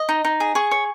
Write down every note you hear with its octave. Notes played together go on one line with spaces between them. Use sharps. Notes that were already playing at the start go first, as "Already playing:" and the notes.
Already playing: D#5
D#4
D#4
G#4
G#4 C#6
C#5